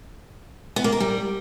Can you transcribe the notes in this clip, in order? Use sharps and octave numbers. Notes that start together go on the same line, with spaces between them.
B3
A#3
A#4
G3